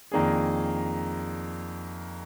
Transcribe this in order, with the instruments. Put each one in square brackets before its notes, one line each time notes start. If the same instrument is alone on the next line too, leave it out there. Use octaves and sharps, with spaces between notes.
[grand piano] F2 D#3 A#3 D4 G#4